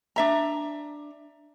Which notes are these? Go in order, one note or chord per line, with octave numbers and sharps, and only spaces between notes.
D4 E5 A#5